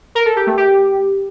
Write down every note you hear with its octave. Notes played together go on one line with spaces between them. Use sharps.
A#4
A4
G4
A3
G4